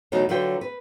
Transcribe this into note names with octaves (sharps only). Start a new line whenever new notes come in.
E2 B2 F#3 A3 D#4
D3 F#3 F4 B4 G5
B4